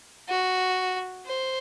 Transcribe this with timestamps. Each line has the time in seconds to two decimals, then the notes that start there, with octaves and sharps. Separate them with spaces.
0.29 F#4
1.26 C5